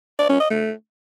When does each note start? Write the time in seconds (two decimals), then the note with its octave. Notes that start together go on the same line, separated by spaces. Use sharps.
0.19 D5
0.30 C#4
0.40 D#5
0.50 A3